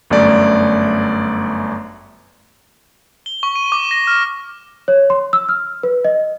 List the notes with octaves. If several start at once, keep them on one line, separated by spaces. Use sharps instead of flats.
G1 F#2 A3 D5
G7
C#6
D#7
D6
A#6
F6
C#5
C6
E6
F6
B4
D#5